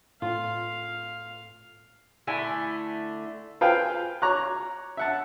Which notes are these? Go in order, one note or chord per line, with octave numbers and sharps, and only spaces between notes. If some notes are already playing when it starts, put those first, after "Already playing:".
A2 F4 F5
D3 A3 E4 G#5
F4 B4 C5 F5 G5 G#5
C#5 A#5 C#6 D6 F#6
E5 F#5 A5